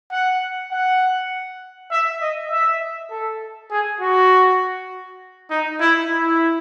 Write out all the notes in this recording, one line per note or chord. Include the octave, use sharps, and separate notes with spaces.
F#5
F#5
E5
D#5
E5
A4
G#4
F#4
D#4
E4
E4